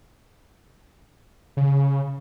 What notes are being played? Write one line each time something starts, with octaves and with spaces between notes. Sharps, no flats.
C#3